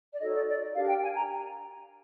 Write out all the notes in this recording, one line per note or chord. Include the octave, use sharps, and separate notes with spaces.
D5
D#4 F#4 A4 C#5 D#5
D5
D5
D4 G4 A#4 F5
G5
G#5
A#5